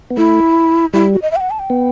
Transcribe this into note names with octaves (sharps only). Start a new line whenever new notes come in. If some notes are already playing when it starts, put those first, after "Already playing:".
B3
A3 E4
G3 E4
F#4
D#5
E5
G5
F#5
A5
G5
B3